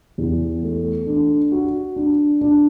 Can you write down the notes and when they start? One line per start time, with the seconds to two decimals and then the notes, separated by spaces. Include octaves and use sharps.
0.18 E2
0.63 A3
1.07 D4
1.52 F#4
1.96 D4
2.41 D4